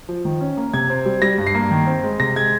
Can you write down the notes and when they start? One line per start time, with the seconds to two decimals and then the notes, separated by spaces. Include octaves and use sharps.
0.09 F3
0.25 D#3
0.41 C#4
0.57 A#3
0.74 C3 G#6
0.90 C4
1.05 G3
1.22 G3 A#6
1.38 G2
1.47 C7
1.55 A#3
1.71 D#3
1.87 C4
2.03 G#3
2.20 C3 A#6
2.36 G#3 G#6